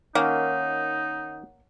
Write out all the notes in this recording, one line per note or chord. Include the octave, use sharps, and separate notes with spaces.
D#3 A#3 C#4 D#4 C#5 F#5